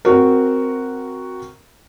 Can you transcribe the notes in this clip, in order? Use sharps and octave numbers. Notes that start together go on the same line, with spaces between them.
C4 F#4 A#4